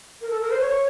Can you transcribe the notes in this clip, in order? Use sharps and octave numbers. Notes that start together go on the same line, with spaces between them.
A#4
A4
A#4
C5
C#5